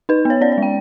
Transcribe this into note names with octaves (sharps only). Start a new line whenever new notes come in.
D#4 B4
B3 C#5
C#4 D5
D5
G#3
G5